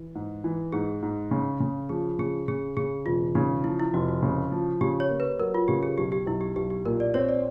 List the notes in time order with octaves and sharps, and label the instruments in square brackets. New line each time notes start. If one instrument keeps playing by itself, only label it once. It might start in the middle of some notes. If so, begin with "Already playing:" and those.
Already playing: [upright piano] E3
G#2
E3
[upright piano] G#2 [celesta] G#4
[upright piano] G#2
C#3
C#3
[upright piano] F3 [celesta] G#4
[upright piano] C#3 [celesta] G#4
[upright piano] C#3 [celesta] G#4
[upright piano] C#3 [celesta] G#4
[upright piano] E1 [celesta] F4
[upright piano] C#3 [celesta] D#4
[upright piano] F3 [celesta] E4
[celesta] E4
[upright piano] F1 [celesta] F#4
[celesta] F#4
[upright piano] C#3
F3
[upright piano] C#3 [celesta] G4
[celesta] C#5
[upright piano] A#3
[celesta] B4
[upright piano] F#3 [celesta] A#4
[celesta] F4
[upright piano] C#3 [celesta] G4
[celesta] G#4
[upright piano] B1 [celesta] G4
[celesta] G4
[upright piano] B1 [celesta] E4
[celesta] G4
[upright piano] B1 [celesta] G4
[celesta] G4
[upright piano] A#2 [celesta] A#4
[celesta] D5
[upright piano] C4 [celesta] C#5
[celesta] D5